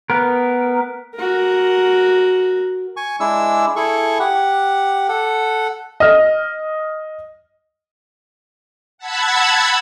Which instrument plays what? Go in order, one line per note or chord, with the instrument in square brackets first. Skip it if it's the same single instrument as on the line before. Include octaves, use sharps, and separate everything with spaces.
[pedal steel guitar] B3 A#4
[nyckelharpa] F#4 A#4
[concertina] G#5 C#6
G#3 D4 E4 E6
E4 G#4 A4 C#6
G4 F#5
A4 F#5
[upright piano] D#5 F6
[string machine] F#5 A5 B5 E6 G#6